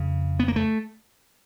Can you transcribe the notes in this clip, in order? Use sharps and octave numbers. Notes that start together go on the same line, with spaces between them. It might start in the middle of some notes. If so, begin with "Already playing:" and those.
Already playing: F2 C#3
B3
A#3
A3